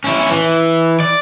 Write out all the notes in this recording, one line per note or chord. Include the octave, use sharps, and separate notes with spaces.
C#4 E4
E3
D5